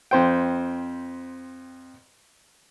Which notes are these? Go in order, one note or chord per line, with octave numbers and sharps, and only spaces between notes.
F2 C5 G5